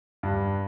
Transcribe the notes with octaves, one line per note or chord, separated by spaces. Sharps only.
G2